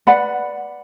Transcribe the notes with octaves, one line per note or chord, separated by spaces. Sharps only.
B4 D5 F#5 B5